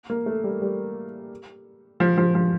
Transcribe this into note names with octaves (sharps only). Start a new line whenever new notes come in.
A#3
A3
G3
G3
F3
F3
F3